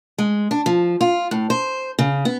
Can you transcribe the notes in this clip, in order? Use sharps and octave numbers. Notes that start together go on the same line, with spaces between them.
G#3
D4
F3
F4
A2
C5
C#3
B3